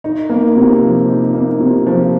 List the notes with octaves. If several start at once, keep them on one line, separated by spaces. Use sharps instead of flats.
D#4
A#3
C3
F3
D#4
A#3
C3
F3